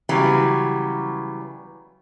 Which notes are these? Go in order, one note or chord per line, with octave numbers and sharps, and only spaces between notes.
C#3 E3 F#3 G3 B3